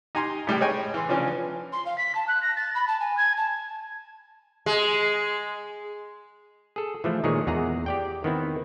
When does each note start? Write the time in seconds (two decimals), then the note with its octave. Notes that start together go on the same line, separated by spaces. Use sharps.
0.15 D#4 G4 G#5 A#5 C6
0.47 A2 G3 G#3 G5
0.60 G#4 C#5 D#5 G5 G#5
0.94 E3 C6
1.09 C#3 E3 F3 C#4 D4
1.72 C6
1.86 F5
1.98 B6
2.15 A5
2.27 F#6
2.42 A#6
2.56 A6
2.75 B5
2.88 A5
3.00 G#5
3.17 G#6
3.37 A5
4.66 G#3
6.76 G#4 A4
7.04 E3 F3 A3
7.24 A#2 D#3 G#3 G#4 C#5
7.47 E2 G#4 F#5 A#5
7.86 G4 D5 G5
8.24 D#3 B3 C4 E4